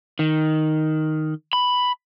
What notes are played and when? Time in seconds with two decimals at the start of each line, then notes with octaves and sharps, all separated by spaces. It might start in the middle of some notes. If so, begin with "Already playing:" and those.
0.19 D#3
1.53 B5